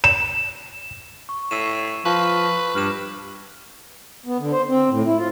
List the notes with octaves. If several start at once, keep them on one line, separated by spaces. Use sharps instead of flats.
E7
C#6
A2 E6 D#7 E7
F3 B4 C#6
G2 F6 E7
B3
D3
C5
C4
A2
E4
F4